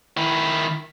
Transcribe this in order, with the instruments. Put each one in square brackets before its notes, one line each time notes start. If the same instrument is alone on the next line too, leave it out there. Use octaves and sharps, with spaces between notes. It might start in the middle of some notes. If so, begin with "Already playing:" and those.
[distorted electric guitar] D#3 E4